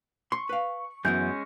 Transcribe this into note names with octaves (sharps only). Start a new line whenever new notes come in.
C6 C#6
B4 F5
F#2 E3 G#3 B3 C#4 G6